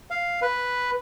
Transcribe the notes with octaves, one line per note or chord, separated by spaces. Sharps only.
F5
B4